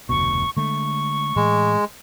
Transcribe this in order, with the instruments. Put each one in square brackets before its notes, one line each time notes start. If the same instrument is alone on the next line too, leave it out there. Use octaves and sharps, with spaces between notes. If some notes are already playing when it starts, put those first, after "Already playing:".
[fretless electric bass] F1 D2 B2 [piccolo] C#6
[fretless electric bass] D3 G#3 A3 [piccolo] C#6
[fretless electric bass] A2 E3 [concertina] G#3